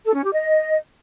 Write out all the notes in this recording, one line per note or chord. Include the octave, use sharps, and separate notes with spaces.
A4
C#4
G4
D#5